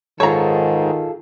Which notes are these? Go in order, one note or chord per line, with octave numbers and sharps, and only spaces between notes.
G#2 D#3 F4 G#4 A4 C#5 A#5